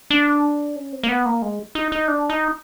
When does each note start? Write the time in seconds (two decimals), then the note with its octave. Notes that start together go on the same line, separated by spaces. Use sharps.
0.10 D4
0.76 C#4
0.92 C4
1.03 A#3
1.09 B3
1.26 A#3
1.42 G#3
1.75 D#4
1.92 D#4
2.08 D4
2.30 D#4